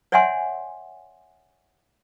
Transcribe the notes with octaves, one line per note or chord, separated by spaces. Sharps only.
C#5 D5 E5 F#5 G#5 C6